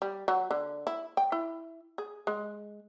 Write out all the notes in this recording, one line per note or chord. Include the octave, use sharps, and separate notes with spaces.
G3
F#3
D3
E4
G5
E4
G#4
G#3